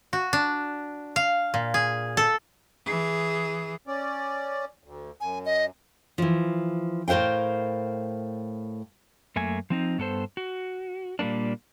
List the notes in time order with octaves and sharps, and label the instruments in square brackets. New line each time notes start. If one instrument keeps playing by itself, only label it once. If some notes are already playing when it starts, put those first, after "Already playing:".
[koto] F#4
D4
F5
A#2
G#4
A4
[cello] E3 G#4
[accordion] C#4 D5
D2
[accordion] F#2 [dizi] G#5
[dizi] D#5
[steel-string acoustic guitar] E3 F3
A2 A#4 C5 F5 G5
[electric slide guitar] F#2 A3 A#3 G#5
F3 C4 D#4
G2 B3 A4 C5
F#4
A#2 G3 G#3 A#3 D4